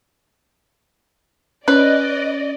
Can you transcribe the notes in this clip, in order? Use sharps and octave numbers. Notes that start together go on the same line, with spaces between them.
C#4 B4 D5 D#5